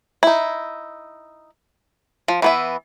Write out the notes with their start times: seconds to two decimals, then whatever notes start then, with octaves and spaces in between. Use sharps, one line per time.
0.23 D#4 E4
2.28 F3
2.42 E3 B3 E5